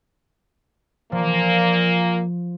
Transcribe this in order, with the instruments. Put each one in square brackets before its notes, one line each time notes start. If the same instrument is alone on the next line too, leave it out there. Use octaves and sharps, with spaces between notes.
[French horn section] A#2 A#3 [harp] F3